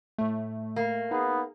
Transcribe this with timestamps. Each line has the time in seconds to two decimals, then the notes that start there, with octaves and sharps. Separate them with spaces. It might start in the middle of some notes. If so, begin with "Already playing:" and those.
0.18 A2 A3
0.76 A#3
1.11 B3 D#4 G#4